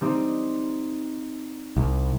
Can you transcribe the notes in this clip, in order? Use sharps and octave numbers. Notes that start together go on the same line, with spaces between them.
G3 C4 D#4
C2